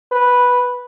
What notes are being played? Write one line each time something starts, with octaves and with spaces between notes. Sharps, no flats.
B4